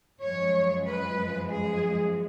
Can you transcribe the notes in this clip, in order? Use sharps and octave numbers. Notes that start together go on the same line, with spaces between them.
F#2 F3 G#3 C#5
B4
G#4